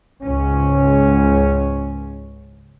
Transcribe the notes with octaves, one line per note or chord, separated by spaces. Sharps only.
C#2 G#2 C#4